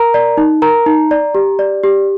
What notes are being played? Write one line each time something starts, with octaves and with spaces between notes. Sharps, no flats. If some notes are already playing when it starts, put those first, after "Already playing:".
Already playing: A#4 A#5
D5
D#4
A#4 A#5
D#4
D5
G4
D5
G4